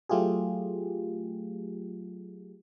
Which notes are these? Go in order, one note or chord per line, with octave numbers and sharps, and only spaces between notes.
F#3 A3 F4 G4 G#4